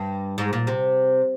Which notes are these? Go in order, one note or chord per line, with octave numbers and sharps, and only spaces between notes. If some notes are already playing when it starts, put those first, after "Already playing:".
Already playing: G2
G#2
A#2
C3